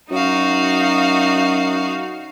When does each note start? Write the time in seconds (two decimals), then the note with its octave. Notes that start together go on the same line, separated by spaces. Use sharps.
0.11 F#2 D#4 F#4 F5